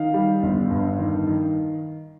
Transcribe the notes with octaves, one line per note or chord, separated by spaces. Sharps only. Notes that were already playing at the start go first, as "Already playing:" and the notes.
Already playing: D#3 F5
G3
G1
G2
D#3
D#3